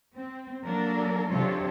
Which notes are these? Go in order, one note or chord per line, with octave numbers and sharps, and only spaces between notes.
C4
F#3 A#3 D4 A4 A#4
C3 F#3 D4 F4 A4 C#5